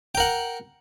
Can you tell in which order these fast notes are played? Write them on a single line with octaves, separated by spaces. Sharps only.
G5 A#4 F#5